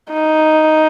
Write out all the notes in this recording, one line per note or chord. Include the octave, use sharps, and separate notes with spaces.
D#4